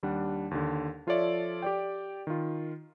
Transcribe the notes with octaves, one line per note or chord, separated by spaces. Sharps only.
D#2 G3 D4 F#5
D#2 D3
F3 F4 A4 C#5 D5 E5
G4 D5 G5
D#3 F4